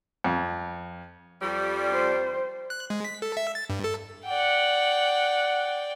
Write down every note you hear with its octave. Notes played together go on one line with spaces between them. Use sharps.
F2
F2 G3
C5
F#6
G#3
B6
A4
E5
A6
G2
A4
D5 F#5 G5